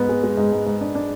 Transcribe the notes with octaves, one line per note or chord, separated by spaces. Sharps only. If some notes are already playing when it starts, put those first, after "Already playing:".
Already playing: G#2 B3
G#3
G#3
G#2
G#2
G#2
D4
D4